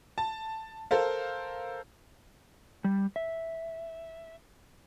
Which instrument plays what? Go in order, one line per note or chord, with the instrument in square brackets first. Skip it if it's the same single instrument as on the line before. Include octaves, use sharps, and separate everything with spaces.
[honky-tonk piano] A5
A4 A#4 C5 F5
[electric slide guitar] G3
E5